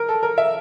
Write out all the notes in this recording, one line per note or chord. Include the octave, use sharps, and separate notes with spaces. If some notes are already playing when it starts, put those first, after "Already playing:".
Already playing: A#4
A4
A#4
E5